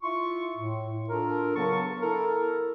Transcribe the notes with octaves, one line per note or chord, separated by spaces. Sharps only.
E4 F4 E5 C6 C#6
A2
D4 F4 A4 A#4
C#3 F#3 B3 A#4 A5 C#6
E4 A4 A#4